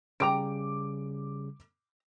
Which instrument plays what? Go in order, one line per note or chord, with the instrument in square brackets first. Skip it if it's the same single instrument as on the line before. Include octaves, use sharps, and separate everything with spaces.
[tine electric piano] C#3 G3 [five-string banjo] D4 G5 A#5 [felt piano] D6 D7